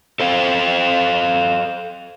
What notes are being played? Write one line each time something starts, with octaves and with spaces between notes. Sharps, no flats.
A4 C5 F5